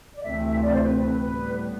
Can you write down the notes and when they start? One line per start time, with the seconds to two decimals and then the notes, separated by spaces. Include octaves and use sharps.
0.15 D5
0.23 D2 C3 E3 A3 C4 E5
0.62 D5
0.72 C5
0.84 B4
0.96 B4
1.09 B4
1.20 A2 G3 B3 B4